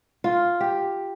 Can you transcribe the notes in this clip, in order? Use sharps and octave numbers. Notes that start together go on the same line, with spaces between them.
F4
G4